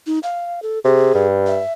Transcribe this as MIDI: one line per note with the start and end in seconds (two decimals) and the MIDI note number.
0.07 0.19 63
0.23 0.60 77
0.63 0.79 69
0.85 1.12 48
0.85 1.26 68
1.15 1.61 43
1.47 1.73 76